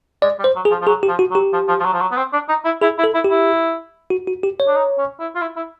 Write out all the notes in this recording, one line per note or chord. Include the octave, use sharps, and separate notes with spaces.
G#3 D5
G3
C5
F#3
G#4
F3
F3
F#3 G#4
G4
F3
F#4
F#3
G4
F3
F3
F3
F#3
F3
F#3
B3
C4
D4
D#4
E4
E4 G#4
E4
A4
E4
G4
E4
F#4
F#4
G4
C#5
D4
D#4
C#4
E4
F4
E4
E4